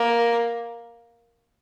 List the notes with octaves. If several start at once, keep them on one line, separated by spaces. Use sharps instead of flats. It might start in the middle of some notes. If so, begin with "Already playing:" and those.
Already playing: A#3